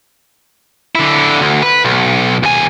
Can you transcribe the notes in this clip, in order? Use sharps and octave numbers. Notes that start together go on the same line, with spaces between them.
D3 E4
D2
B4
B1
D#2 G#5